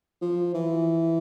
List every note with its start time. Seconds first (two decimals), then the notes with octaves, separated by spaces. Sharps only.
0.22 F3
0.54 E3